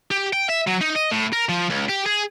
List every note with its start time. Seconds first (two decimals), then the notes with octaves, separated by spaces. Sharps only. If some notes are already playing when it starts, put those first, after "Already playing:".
0.11 G4
0.33 G5
0.49 E5
0.67 F#3
0.81 D#4
0.95 D#5
1.11 A2
1.33 A#4
1.49 F3
1.70 C#2
1.89 G4
2.06 G#4